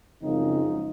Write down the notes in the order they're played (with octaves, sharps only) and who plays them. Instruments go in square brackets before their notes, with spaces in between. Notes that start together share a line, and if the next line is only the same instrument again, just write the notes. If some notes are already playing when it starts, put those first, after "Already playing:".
[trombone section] F#2 C#3 F3 G#3 C4 D#4